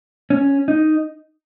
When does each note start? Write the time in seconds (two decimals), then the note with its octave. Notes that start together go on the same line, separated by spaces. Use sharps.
0.30 C#4
0.68 D#4